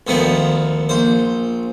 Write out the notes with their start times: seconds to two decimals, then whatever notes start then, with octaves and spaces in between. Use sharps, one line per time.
0.07 D2 D#3 F3 B3 C4
0.89 A#1 C5